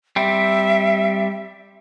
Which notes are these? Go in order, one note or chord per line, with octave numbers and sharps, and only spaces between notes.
G3 C4 E5